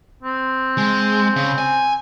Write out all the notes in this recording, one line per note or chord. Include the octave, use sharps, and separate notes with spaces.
C4
G#3
C#3
G#5